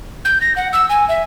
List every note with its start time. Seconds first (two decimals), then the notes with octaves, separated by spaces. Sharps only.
0.25 G6
0.41 A#6
0.56 F#5
0.73 E6
0.89 G#5
1.09 E5